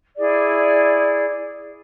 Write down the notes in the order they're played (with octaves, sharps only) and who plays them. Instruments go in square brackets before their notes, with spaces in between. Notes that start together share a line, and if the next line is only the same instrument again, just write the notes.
[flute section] E4 G#4 D5